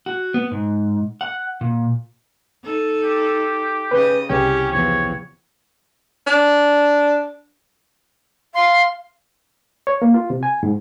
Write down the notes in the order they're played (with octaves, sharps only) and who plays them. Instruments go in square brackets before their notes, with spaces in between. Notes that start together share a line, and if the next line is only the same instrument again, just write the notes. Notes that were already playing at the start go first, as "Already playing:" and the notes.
[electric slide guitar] F#4
B3
G#2
F#5
A#2
[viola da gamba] D#4 A4
[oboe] G4
[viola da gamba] C#3 D#5 [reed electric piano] B4 G6
[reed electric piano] C2 C#3 G5 [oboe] C#4 [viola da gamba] G4
[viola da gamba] E2 F3 [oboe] C#5
[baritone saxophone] D4
[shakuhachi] F5 [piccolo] C6
[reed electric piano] C#5
A#3
F4
C3
G#5
G#2